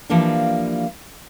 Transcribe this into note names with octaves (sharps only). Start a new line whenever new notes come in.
E3 F3 G3 A#3 D4 F5